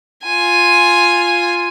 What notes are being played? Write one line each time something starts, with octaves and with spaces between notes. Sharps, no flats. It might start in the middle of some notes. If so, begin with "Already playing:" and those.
F4 G#5